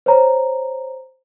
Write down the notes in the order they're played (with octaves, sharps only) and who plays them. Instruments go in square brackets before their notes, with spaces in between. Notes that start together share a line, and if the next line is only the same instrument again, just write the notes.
[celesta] C5 C#5 A#5